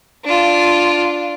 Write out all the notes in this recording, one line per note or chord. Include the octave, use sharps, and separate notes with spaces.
D4 F4